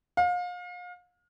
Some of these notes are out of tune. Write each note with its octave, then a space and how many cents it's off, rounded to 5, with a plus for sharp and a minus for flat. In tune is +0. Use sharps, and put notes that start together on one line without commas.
F5 +35